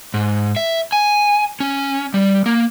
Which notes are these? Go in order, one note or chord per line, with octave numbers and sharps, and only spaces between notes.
G#2
E5
G#5
C#4
G3
A#3